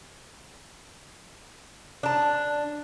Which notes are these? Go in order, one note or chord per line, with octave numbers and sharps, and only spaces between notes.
D4 A5